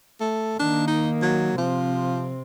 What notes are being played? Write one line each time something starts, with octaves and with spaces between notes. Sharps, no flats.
A3
D#3 A#3 D4
D#4
F#3
C3 F3 C4